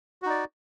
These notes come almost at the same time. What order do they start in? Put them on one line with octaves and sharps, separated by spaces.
F#4 D#4 D5